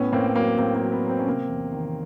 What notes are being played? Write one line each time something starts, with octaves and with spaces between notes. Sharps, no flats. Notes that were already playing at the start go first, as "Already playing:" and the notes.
Already playing: A2 B3 C#4
A2 A#3 C4
F#3 A#3
A2 A#3 C4
A#3
F#3
B3
F#3
C4
C#4
C3 A#3 C4
E2
D#3